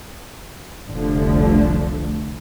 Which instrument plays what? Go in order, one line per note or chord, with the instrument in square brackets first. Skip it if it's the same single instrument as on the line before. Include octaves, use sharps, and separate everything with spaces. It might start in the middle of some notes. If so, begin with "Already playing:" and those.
[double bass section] F1 C2 D3 F3 A3